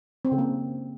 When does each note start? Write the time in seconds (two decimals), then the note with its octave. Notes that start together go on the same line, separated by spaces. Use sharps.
0.25 C4
0.32 C#3
0.38 A#3